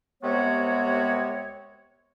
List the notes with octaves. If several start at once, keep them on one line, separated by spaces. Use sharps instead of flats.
C2 C3 G#3 B3 F#4 C#5